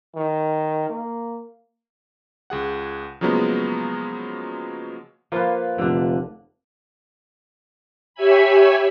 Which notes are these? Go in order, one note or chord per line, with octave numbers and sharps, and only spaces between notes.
D#3
A#3
C#2 G#4 F#5
C#3 F3 F#3 G#3 A#3 B3
F3 A#3 F4 B4
F1 D3 D4
G4 C#5 E5 G#5 B5